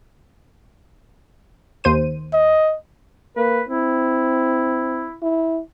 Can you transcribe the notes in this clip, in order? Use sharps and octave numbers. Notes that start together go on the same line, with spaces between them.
D#2 C5 D#7
D#5
A#3 B4
C4 E4
E4